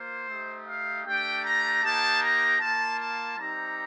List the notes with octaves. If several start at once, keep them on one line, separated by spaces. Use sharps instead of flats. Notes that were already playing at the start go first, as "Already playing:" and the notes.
Already playing: A#3 F4 C5
A3 D#4 G4
F5
A3 D4 G4 G5
A#5
A#3 D#4 G4 A5
A#5
A#3 F4 A5
A5
G3 C4 D#4 G4 A#5